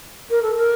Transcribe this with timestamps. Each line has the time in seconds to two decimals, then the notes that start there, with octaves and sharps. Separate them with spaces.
0.30 A#4
0.43 A4
0.56 A#4